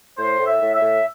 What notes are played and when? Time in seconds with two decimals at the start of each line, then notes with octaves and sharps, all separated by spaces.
0.18 A2 C5
0.39 A2
0.46 E5
0.61 A2
0.75 E5
0.81 A2